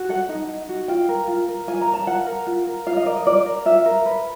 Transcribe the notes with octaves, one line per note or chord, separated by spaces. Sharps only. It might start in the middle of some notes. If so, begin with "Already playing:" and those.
Already playing: F#4
A4 F#5
D#4
D#4
F#4
F4 G5
A#4
F4
A#4
F4 G#5
A#5
A#4
A5
F4 F#5
A#4
F4
A#4
F4 F5
D#5
A#4 D5
D#5
F4 D5
A#4
F4 E5
A#4
B4